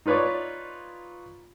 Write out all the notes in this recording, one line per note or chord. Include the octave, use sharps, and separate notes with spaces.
D#4 F4 B4 C#5 D5